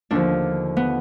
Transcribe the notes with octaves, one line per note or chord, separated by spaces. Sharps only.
D#2 D3 F3 D4
B3